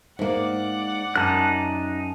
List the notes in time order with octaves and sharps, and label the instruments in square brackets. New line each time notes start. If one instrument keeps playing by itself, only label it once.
[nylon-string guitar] G#2 A#3 [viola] D5 F#5
[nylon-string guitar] F#2 [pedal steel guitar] D#4 A5 F#6